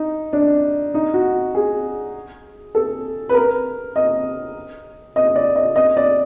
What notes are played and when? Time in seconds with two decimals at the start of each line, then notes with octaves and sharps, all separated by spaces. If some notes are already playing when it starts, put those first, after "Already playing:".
Already playing: D#4
0.33 D4
0.94 D#4
1.14 F#4
1.55 G#4
2.75 A4
3.29 B4
3.34 A#4
3.96 D#5
5.16 D#5
5.36 D5
5.56 D#5
5.76 D#5
5.97 D5